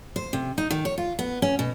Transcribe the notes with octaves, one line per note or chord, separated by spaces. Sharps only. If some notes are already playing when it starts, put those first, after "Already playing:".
C5
C3
D#4
D#3
C#5
F4
B3
C#4
B2